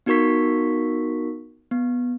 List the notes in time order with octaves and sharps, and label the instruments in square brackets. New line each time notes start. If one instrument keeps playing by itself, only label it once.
[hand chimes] B3 D#4 F#4 A#4 C#6 B6
B3